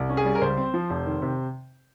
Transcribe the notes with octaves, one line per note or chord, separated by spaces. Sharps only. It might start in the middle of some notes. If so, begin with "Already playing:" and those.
Already playing: C2
C#4
G#4
G3
A#4
C#2 C5
C4
F3
F1
D#3
C3